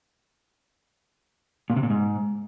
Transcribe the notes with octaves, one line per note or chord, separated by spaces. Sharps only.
A#2
C3
A#2
G#2